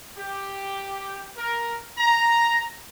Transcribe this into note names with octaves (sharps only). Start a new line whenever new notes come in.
G4
A#4
A#5